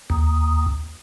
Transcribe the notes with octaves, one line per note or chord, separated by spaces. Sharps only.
D#2